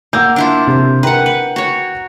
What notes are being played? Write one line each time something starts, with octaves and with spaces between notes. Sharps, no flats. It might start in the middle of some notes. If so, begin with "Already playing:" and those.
A#3 F#5 E6 G6
D4 E4 F4
C3
A#4 B4 F#5 G5 A#5
B4
F#4 C#5